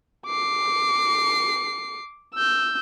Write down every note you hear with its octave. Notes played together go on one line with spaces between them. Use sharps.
D6 C7
E6 G6